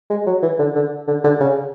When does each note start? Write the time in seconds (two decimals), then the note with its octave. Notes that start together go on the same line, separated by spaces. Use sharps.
0.10 G#3
0.26 F#3
0.42 E3
0.59 D3
0.75 D3
1.07 D3
1.24 D3
1.40 C#3